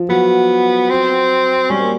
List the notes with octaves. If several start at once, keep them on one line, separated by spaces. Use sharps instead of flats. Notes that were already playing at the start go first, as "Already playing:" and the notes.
Already playing: F3
F#3 B3
C4
G3 C#4
A#3